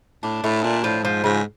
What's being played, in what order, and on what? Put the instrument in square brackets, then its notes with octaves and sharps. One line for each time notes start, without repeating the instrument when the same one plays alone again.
[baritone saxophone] A2 [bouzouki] D4
[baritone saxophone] A2 [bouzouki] A3
[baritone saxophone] A#2 [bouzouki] D4
[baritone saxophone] A2 [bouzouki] F3
[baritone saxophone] G#2 [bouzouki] F3
[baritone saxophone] G#2 [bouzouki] C#3